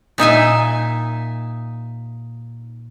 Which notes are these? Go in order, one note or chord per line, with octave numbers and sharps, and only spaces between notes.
A#2 D#4 E5 G#5